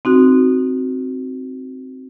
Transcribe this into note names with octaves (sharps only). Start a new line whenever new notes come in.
C4 D#4 F#4